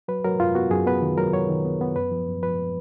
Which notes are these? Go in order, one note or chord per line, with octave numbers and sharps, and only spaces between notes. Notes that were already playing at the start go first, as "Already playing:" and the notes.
F#3 B4
F#3 A#4
F#2 F4
B3 F#4
F#2 G#4
B3 B4
D#3
F#3 A#4
F#3 C#5
D#3
B3
B3
F#2 B4
F3
F#2
F3 B4